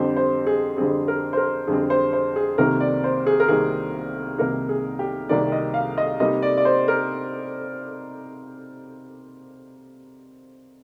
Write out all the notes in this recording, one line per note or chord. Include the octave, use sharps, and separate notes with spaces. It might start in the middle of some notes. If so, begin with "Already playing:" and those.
Already playing: F2 D3 G3 C4 C5
C5
G#4
F2 D3 G3 C4 G#4
A#4
C5
A#4
F2 D3 G3 C4 G#4
C5
C5
G#4
C2 C3 D#3 A#3 D#4 A#4
D5
C5
G#4
A#4
C2 C3 D#3 A#3 D#4 G#4
C2 C3 D#3 A#3 D#4 A#4
G#4
G4
C2 C3 D#3 A#3 D#4 D5
D#5
F5
D#5
C3 G3 A#3 D#4 D#5
D5
D5
C5
A#4